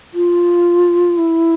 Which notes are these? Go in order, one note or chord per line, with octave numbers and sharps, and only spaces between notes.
F4
E4